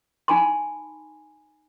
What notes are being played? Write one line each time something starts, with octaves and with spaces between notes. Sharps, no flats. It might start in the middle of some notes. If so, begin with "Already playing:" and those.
D#4 G#5 A5 B5 C6